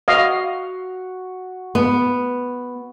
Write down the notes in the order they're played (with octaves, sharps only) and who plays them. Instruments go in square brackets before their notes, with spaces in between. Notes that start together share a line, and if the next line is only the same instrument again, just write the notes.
[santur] F#4 [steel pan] D#5 F5
[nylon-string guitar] B3